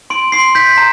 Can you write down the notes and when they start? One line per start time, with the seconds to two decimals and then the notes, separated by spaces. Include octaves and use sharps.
0.10 C6 D7
0.32 C6 C7
0.55 G6 B6
0.77 A#5